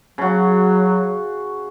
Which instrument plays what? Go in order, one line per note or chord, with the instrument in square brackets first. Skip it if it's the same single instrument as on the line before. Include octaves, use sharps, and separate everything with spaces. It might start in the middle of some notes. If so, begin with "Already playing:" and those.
[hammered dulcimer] C#3 F#4 [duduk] F#3